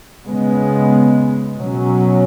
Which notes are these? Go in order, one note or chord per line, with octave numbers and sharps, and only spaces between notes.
C#3 G#3 B3
B2 F#3 C#4